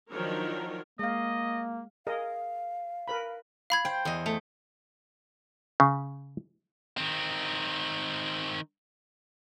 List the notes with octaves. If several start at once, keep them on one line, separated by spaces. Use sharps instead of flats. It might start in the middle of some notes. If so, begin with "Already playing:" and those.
D#3 F3 F#3 D4 A#4 C#5
G#3 A#3 D#5 F5
G#4 A#4 D#5 F5
A#4 B4 B5
F5 B5 G#6
C5 G5
E2 D#5
A3
C#3
D#3 C4